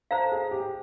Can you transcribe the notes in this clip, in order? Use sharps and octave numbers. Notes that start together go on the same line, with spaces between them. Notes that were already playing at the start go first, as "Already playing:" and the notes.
A4 C5 F5 A#5
G#4
G4